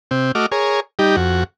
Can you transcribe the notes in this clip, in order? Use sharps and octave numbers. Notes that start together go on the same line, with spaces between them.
C3 C4
A3 F#4 D#5 D6 F6
G#4 A#4 C#5
G3 D#4 G4
F2 F#4